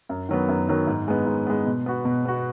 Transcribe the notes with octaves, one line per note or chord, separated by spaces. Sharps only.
F#2
D#3 F#3 B3
F#2
D#3 F#3 B3
G#2
G#3 B3
G#2
G#3 B3
B2
B3 F#4
B2
B3 F#4